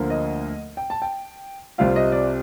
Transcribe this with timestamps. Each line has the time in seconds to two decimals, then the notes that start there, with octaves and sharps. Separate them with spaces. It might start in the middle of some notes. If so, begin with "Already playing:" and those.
Already playing: D2 D3 F3 A#3
0.10 D#5
0.77 G5
0.90 A5
1.02 G5
1.78 C2 C3 G3 C4 F4 F5
1.96 D#5
2.12 D5